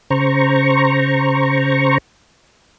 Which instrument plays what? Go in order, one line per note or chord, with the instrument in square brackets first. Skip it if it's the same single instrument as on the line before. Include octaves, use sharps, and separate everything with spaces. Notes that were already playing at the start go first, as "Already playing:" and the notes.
[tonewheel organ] C#3 C5 A#5 C#6